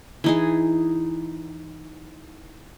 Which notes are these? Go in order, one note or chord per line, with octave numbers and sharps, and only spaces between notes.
E3 D#4 G#4